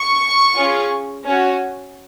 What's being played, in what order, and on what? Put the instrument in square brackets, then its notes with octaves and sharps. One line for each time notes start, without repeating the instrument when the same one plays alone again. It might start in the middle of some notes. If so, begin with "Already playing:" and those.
Already playing: [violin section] C#6
C#4 F4 G#4
C#4 F#4